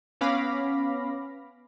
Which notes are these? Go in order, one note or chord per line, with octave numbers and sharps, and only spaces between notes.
B3 C#4 F5 B5 D6 A#6